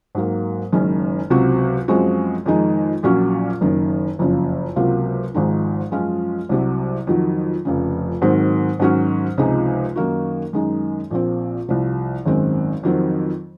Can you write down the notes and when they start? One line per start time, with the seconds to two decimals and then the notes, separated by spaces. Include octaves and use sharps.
0.15 G#2 F#3 A#3
0.73 F#1 F#2 D#3 G#3 C#4
1.30 C#2 C3 F#3 C4 F#4
1.88 F#2 F3 G#3 C4 F#4
2.46 F2 D#3 G#3 D#4
3.03 A#1 A#2 F#3 C#4 F#4
3.61 F#1 F#2 D#3
4.19 F#1 F2 C#3 F3
4.76 C#2 C3 F#3 A#3 F4
5.34 G#1 G#2 F3 G#3 D#4
5.91 F#2 F3 G#3 C#4 F4
6.49 C2 C3 F#3
7.07 F2 D#3 F#3
7.65 F1 F2 C#3
8.22 G#2 D#3 F#3 C4
8.80 G#2 D#3 F#3 C#4 F#4
9.38 C#2 C3 F3 G#3 D#4
9.96 F#2 D#3 A#3 D#4 F#4
10.53 F#2 D#3 G#3 D#4
11.11 A#1 A#2 F3 C4
11.68 C2 C3 F3
12.25 G#1 F#2 D#3 G#3 C4
12.83 F2 D#3 F#3 C4